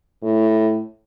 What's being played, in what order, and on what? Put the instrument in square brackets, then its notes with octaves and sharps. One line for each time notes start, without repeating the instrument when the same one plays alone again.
[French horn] A2